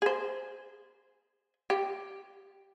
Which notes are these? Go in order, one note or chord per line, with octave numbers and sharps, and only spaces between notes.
G#4 C5
G4